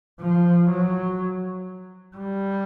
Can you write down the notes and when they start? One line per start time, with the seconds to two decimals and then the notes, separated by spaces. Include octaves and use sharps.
0.21 F3
0.70 F#3
2.16 G3